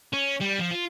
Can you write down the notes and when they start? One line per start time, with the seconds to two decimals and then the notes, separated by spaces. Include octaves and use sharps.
0.14 C#4
0.41 G3
0.59 F3
0.71 F4